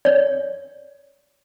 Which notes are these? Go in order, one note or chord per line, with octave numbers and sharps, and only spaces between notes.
C#5 D5